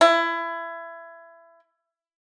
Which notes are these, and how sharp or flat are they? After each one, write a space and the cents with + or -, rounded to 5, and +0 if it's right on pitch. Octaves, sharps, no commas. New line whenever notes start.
E4 +25